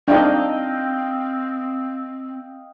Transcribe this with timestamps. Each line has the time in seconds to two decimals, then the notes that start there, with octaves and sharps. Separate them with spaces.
0.08 C4 D4 D#4 D#5 F5 G5